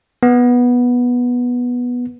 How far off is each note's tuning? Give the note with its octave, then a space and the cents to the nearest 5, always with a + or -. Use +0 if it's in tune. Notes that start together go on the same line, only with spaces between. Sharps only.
B3 -10